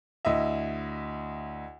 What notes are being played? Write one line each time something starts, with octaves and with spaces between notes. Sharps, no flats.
D2 E4 D#5 E5